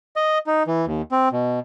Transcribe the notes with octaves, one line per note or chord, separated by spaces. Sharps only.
D#5
D#4
E3
D#2
C4
B2